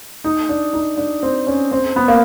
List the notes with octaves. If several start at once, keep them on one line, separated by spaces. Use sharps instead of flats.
D#4
D4
D#4
D4
C4
C#4
C4
B3
A#3